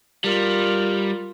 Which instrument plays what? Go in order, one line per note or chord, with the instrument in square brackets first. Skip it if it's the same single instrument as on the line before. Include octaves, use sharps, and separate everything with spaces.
[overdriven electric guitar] G3 [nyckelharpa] F4 A#4